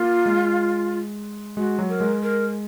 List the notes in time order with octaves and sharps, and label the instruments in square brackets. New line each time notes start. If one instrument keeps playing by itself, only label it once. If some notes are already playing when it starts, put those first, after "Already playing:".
Already playing: [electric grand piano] A#3 [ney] F4
[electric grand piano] G#3
[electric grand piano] G#3 [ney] F#4
[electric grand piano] F#3
[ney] A#4
[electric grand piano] G#3
[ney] A#4